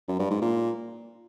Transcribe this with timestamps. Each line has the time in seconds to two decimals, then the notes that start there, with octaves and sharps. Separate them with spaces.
0.08 F#2
0.19 G2
0.30 G#2
0.41 A#2